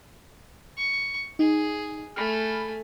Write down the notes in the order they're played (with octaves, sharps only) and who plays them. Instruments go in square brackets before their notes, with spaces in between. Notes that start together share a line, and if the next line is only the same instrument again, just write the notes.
[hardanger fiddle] C#6
[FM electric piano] D#4 [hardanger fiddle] G#4
[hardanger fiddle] A3 G#5 [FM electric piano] B5 F6